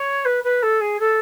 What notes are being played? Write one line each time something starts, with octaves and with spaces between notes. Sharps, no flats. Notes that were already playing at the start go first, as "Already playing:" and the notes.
Already playing: C#5
B4
B4
A4
G#4
A4